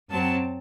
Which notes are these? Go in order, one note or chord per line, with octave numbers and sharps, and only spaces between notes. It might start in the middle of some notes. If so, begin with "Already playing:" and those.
F#2 F#3 C4 A5